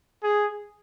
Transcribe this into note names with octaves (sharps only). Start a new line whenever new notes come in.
G#4